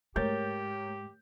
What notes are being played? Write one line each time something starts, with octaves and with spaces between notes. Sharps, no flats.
G#2 G#3 A3 G4 A#4 C#5 G6 A6